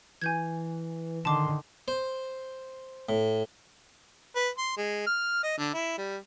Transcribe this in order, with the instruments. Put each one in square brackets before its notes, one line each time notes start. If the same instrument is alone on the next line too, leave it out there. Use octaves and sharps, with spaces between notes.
[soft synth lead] E3 [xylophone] G#5 G6 G#6
[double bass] D3 D#3 [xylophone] A5 D6 [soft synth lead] C6
[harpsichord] C5
A2
[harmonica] B4
C6
G#3
F6
D#5
D3
E4
G3